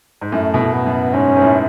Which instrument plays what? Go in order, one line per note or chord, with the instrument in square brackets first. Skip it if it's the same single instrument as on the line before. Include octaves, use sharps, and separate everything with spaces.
[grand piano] G#2
[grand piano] F#2 A2 [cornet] A3
[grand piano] B2
F#2 A2
[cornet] B3
[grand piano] F#2
[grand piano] G#2 [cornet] C#4
[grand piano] G#2
F#2 A2